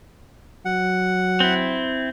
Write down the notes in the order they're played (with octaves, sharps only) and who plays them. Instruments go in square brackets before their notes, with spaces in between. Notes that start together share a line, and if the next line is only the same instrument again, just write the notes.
[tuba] F#3 [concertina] F#5
[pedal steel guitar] C4 E4